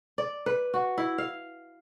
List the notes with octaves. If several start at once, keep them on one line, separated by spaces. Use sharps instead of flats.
D5
B4
F#4
E4
F5